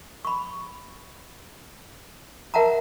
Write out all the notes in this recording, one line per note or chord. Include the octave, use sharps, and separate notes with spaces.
B5 C#6
A#4 E5 F#5 A5 A#5